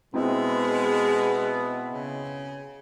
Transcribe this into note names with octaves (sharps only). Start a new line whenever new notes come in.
B2 G#3 B3 C4 E4 D#5
C#3